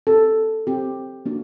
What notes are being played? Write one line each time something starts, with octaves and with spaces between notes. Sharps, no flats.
C4 G4 A4
C4 G4
A#3 D4 F#4